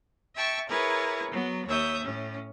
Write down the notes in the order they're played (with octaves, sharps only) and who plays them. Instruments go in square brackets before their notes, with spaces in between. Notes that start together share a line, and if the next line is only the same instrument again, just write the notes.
[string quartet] E5 G5 A5 C#6
E4 G#4 A#4 B4 C#5
F#3 B3
D#2 C#5 E5 D#6 G6
A2 C#4